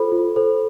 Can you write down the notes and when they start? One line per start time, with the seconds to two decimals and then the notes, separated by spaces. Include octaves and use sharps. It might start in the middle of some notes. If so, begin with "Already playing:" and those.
Already playing: F4 A4 C5 B5
0.12 F4
0.36 A4 C5